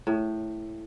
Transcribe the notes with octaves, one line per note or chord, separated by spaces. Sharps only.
A2